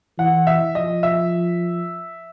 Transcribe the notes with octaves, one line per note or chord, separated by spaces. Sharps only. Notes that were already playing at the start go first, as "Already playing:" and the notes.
E3 F#5
E5
F3 D#5
E5